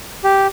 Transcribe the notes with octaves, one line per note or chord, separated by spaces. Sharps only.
G4